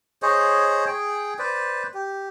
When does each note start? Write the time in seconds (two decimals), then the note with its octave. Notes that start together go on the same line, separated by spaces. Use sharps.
0.22 G#4 C5 C#5 D#5
0.87 G#4 G5
1.39 B4 C5 D5
1.94 G4